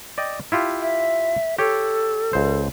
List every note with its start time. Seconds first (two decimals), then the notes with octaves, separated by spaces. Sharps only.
0.18 D5 D#5 G5
0.52 E4 F4 G4
0.81 E5
1.59 G4 A4 C#5
2.33 C#2 C5